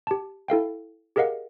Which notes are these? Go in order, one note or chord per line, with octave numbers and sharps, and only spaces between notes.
G4 A5
E4 A4 F5 G5
G4 G#4 A#4 D#5 F5 F#5